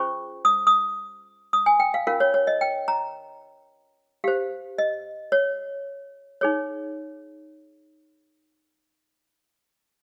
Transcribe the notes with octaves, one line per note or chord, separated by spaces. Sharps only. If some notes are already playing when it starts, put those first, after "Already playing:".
Already playing: C#4 F4 G#4 C5 C#6
D#6
D#6
D#6
G#5
G5
F5
C#4 F4 A#4 F5
C#5
C#5
D#5
G5
A#5
G4 C5 F5
D#5
C#5
D#4 G#4 C#5